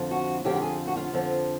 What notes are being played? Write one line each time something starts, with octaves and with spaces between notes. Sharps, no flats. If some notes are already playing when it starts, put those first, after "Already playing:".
Already playing: F2 D3 F3
F#4
F2 D3 F3 G4
G4
G#4
F#4
F4
F2 D3 F3